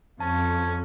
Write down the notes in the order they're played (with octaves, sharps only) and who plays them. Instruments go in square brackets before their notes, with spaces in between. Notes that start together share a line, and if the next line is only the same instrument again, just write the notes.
[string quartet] F2 [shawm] C#4 [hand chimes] A5